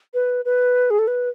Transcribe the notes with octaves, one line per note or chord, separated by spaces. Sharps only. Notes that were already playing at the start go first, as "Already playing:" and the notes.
B4
B4
G#4
A4
B4